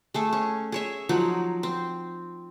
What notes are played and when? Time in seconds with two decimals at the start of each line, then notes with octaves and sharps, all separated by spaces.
0.14 A3 G#4 A4
0.33 C#4
0.72 G#4 C#5 E5
1.09 F3 F#3 D#4
1.63 C4